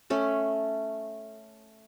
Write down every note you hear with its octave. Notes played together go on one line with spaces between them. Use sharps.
A3 C#4 A4